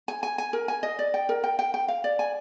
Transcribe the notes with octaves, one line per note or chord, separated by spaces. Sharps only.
G#5
G#5
G#5
A#4
G#5
D#5
D5
G5
A#4
G5
G5
G5
F5
D5
G#5